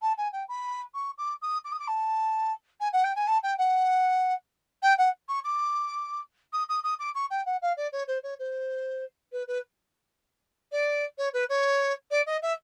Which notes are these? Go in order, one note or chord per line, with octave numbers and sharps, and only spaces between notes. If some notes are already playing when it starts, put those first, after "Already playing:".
A5
G#5
G5
B5
C#6
D6
D#6
D6
D#6
D6
A5
G#5
F#5
G5
G#5
A5
G5
F#5
G5
F#5
C#6
D6
D#6
D#6
D#6
D6
C#6
G5
F#5
F5
D5
C#5
C5
C#5
C5
B4
B4
D5
C#5
B4
C#5
D5
D#5
E5